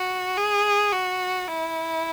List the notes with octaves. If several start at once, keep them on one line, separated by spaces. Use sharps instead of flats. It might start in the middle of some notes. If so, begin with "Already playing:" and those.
Already playing: F#4
G#4
F#4
E4